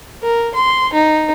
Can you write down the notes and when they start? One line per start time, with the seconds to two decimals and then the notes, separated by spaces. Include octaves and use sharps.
0.23 A#4
0.54 C6
0.93 D#4